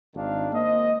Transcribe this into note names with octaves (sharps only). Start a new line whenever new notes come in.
G#1 D#3 D4 F5
A#3 C5 D#5